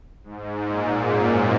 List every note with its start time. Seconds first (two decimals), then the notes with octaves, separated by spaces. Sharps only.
0.24 G#2
0.64 A#2
1.04 F#2